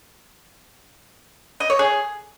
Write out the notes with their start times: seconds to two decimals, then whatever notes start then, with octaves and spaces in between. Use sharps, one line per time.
1.60 D#5
1.70 C#5
1.79 G#4